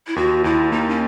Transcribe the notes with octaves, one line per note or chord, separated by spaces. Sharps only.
E4
D#2 F#4
D#2 E4
A#3 D#4
C#4